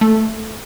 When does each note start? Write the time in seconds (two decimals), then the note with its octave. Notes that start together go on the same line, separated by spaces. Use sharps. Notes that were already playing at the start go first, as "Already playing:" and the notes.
0.01 A3